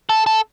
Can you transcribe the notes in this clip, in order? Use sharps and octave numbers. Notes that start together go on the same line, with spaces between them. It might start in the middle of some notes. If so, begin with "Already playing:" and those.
A4
A4